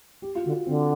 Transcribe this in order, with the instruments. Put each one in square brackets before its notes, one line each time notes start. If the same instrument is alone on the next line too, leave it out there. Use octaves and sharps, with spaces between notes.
[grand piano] G4
F4
[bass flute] D3 [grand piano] F#4
[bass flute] D3 [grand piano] C4